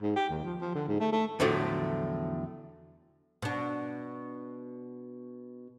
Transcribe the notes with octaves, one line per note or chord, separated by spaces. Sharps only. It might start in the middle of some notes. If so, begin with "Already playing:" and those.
G#2
G4
D#2
F3
F3
D3
G#2
A3
A3
E2 A2 D3 F3 F#3 A3
B2 D4